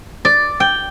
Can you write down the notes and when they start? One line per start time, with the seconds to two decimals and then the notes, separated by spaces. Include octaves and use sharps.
0.25 D5
0.60 G5